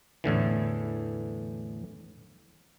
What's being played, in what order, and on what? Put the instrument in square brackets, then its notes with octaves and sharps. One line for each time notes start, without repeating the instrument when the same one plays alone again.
[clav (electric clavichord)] E2 A2 D3 E3